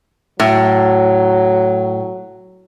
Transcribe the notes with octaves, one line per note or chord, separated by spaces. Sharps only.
A2 F#3